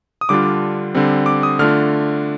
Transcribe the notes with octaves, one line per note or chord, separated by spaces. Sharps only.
D#6
D3 G3 D4 F4 D6
D3 G3 C4
D6
D#6
D3 A3 D4 F4 F6